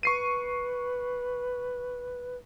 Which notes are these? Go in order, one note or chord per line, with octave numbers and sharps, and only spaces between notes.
B4 C#6 C7 D#7